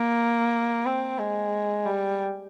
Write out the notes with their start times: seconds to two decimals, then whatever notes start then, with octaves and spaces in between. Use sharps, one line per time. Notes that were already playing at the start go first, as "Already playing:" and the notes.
Already playing: A#3
0.86 C4
1.19 G#3
1.86 G3